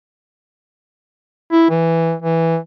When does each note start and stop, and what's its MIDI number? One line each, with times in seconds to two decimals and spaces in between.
1.52 1.67 64
1.70 2.14 52
2.22 2.58 52